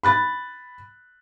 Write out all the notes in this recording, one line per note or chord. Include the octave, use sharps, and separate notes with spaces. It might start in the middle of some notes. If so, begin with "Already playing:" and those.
B5 F#6 A6